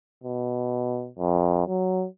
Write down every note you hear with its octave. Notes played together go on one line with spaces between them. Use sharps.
B2
F2
F#3